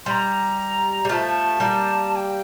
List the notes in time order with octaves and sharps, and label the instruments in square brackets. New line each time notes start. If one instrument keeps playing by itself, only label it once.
[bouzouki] G3 [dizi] A#5 C6
[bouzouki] G3
[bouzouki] F3 A3 [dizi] A5 A#5
[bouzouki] G3 A#3
[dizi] A5
G5